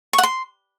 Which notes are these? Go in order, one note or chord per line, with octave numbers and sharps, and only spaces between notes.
C#6
F#5
C6